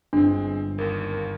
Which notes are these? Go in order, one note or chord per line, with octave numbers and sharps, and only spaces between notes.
G1 G#3 C4 D4
G#1 D#2 A#4